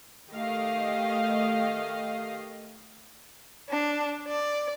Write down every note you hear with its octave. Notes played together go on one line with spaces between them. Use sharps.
D#3 A3 G4 D#5 F5
D4
D5